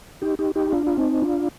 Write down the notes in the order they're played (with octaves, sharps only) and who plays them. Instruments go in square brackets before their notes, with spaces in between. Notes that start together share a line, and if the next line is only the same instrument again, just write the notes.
[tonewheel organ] D#4 G4
D#4 G4
D#4 G4
D4 F4
F4
C4 D#4
D4 F4